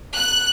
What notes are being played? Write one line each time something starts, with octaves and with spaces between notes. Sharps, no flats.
F#6